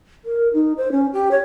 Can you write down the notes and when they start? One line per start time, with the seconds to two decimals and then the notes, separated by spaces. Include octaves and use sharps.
0.24 A#4
0.53 D#4
0.77 C5
0.91 C#4
1.13 G4
1.31 C#5